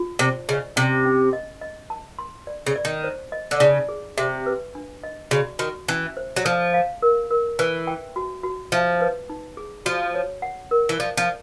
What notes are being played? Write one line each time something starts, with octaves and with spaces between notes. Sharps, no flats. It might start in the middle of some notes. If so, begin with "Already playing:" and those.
Already playing: F4
C3 C5
C#3 D#5
C3 C#4
C#4
D#5
D#5
A5
C6
D5
C#3
D5
D#3
C5
D#5
D3
C#3 D#4
G#4
C3 E5
B4
D4
D#5
C#3 F#4
D#3 F#4
E3 C#4
C5
F#3
F3 A4
F5
A#4
A#4
E3 B4
G5
F#4
F#4
F3 E5
B4
D#4
G#4
F3 F#4
C#5
F#5
A#4
E3
F3 D5
F3